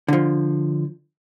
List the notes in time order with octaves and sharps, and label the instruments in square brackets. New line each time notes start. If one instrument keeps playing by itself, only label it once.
[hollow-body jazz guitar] D3 F3